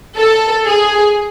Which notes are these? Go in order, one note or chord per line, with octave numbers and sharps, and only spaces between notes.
A4
G#4